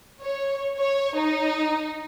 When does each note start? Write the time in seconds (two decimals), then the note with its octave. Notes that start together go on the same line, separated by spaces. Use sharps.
0.23 C#5
0.78 C#5
1.18 D#4